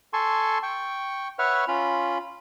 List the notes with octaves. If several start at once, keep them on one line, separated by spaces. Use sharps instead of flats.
A4 G#5 A5 C6 C#6
G5 C#6
B4 C#5 E5 F#5 C#6 F6
C#4 F4 B5